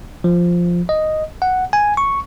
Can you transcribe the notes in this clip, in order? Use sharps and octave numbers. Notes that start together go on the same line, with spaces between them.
F3
D#5
F#5
G#5
C#6